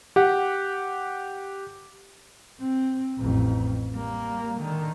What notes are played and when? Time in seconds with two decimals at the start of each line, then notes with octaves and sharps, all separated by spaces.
0.16 G4 F#5
2.60 C4
3.18 A1 F2
3.93 G3 A#3
4.58 D3 D#3